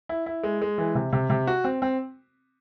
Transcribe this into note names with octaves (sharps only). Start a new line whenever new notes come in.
E4
E4
G#3
G#3
E3
C3
C3
C3
F#4
C4
C4